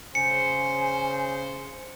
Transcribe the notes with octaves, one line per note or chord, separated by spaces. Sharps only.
C#3 C5 G#5 C#7